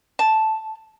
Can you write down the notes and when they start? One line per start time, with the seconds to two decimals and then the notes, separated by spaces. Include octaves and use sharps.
0.19 A5